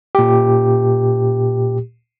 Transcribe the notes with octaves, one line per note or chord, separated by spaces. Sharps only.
A#2 G4